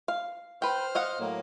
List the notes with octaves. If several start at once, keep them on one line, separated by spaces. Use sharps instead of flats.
F5
B4 C5 G5 F6
D#5 F5 F#5
A2 F#3 A#3